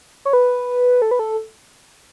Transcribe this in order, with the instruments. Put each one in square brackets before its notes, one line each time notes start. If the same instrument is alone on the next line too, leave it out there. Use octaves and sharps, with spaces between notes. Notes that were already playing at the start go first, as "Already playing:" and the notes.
[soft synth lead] C#5
B4
A4
B4
A4